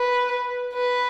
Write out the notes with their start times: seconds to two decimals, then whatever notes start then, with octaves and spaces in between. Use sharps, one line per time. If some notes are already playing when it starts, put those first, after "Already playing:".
Already playing: B4
0.73 B4